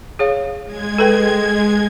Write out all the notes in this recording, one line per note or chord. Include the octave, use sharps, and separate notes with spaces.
G#4 C#5 F5
G#3 G#6
A4 B4 G5